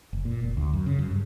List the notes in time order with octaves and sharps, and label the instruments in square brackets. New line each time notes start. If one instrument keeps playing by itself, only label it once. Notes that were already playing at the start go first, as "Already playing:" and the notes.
[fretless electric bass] F#1
A#2
F1
D2
F#2
C#3
F#2
G2